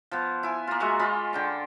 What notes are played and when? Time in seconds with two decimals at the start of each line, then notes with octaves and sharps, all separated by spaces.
0.11 F3 B3
0.43 E4 G#5
0.67 A#3 F4
0.80 G#3 F#4 E5 C#6
0.99 F4 D#5 B5
1.33 D3 G5 A5